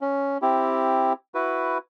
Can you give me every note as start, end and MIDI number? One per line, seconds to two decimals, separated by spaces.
0.01 0.38 61
0.42 1.13 60
0.42 1.13 64
0.42 1.13 67
1.34 1.78 64
1.34 1.78 66
1.34 1.78 71